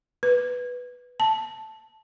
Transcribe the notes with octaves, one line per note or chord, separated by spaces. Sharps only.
B4
A5